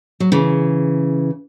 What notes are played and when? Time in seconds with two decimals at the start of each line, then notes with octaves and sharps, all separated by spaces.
0.20 F#3
0.32 C#3 E3